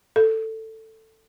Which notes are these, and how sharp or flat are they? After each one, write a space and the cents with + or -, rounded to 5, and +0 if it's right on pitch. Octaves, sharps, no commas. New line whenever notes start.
A4 +10